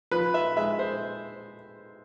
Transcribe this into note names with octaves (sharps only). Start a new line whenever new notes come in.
F3 B4
E5
G#3 E5
C5